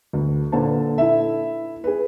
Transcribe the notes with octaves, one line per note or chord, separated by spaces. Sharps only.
D2
A#2 D3 B4 C5 A5
E4 A4 E5
G#4 B4